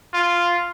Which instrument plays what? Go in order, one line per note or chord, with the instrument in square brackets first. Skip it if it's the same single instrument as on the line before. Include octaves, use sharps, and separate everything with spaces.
[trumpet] F4